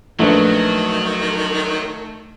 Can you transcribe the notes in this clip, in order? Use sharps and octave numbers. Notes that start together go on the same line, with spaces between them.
A#1 D#3 F#3 A3 B4